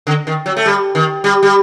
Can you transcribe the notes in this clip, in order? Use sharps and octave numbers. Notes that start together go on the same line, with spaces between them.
D3
D#3
F#3
A3
G3
D#3
G3
G3